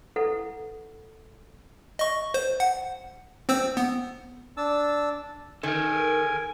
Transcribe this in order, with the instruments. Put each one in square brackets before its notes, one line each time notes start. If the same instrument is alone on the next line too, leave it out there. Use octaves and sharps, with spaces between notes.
[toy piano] E4 A4 B4 F#5
[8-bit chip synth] D#5 C#6
C5
F#5
C4 C5 E6
B3
[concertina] D4 A5 E6
[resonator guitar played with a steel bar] D#3 [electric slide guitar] A4 A#4 [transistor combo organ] G#5